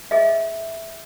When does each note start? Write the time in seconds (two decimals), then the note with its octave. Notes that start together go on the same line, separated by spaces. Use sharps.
0.11 G#4 D#5 E5